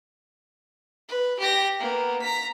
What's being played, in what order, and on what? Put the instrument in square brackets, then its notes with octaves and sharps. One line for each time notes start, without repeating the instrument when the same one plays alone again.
[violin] B4
G4 A#6
A#3 B3
A#5 B6